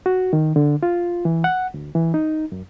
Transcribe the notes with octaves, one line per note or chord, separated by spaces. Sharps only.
F#4
D#3
D3
F4
E3
F#5
D2
E3
D#4
F#2